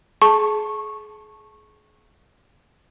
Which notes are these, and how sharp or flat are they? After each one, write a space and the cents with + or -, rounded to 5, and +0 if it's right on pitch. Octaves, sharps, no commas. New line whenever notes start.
G#4 +30 A5 +0 C#6 -15